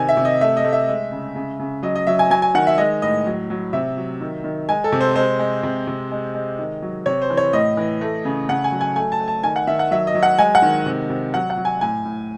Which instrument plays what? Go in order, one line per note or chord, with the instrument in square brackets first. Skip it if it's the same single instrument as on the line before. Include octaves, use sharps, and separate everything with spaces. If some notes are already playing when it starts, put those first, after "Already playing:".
Already playing: [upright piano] C3 D#3 G#5
E5
C3
D#5
A3 E5
D#5
A3
E5
G#3
C#3
C#3
C#3
F#3 D#5
D#5
F#3 E5
G#5
F#3 G#5
G#5
D#3 F#5
E5
G#3 D#5
A2 D#5
F#3
F#3
C3 E5
F#3
D#3
D#3
G#3 G#5
A4
C3
C5
G#3 C5
G#3
C3
C3
G#3
G#3
D#3
F#3
C3 C#5
C5
E3
C#5
A2 D#5
E3
A3
C#3
C#3 F#5
G#5
F#3
G#5
A3 G#5
A5
A3
A5
D#3 G#5
F#5
D#3 E5
F#5
F#3 E5
D#5
F#3
F#5
G#3 G#5
F#5
D#3
C3
C3
F#3 F#5
F#5
F#3
G#5
A2 G#5
A2